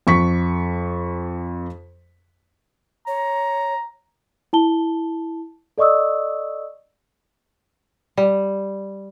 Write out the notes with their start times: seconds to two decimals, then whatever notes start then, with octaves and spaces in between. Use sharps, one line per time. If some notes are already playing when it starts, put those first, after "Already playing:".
0.07 F2 C#6 B6
3.07 C#5 A#5
4.53 E4 A5 G7
5.78 A4 D5 D#5 C#6 D#6 E6
8.17 G3